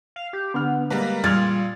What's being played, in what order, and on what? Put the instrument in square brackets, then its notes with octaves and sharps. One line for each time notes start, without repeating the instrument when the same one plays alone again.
[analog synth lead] F5
G4
[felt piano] D3 F6 [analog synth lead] B3
[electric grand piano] G3 G#3 B4 [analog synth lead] A#3 [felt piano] A#5
[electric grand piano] A#2 G#4 D5 [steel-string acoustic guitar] G3 [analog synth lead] F4 [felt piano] F6 G#6 A6